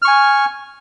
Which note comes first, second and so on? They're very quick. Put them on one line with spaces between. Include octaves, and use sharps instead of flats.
F6 C#6 G#5